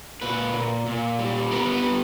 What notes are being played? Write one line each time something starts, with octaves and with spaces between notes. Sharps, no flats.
A#2 B4
A#2
A#2
G3
B3 A#4
B4
G3